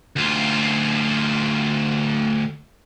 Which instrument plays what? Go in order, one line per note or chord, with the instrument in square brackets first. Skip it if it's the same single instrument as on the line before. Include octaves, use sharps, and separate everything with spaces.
[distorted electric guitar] D2 F4